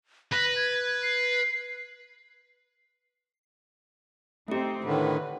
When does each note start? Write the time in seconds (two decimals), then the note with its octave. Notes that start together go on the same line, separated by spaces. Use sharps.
0.32 B4 A#6
0.56 G#6
1.03 C7
4.48 A3 C4 D#4 G4
4.84 A2 D3 D#3 B4